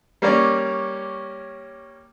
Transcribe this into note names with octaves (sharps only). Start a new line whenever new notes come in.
G3 A#3 C#4 C#5 D5